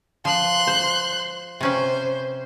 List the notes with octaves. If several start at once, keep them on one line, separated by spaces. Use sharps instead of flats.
F3 C6 F#6
C5
C3 C#4 B4 C5